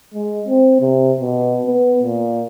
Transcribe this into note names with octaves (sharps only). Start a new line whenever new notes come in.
G#3
C4
C3
B2
B3
A#2